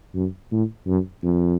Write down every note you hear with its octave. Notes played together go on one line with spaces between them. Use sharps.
F#2
A2
F#2
F2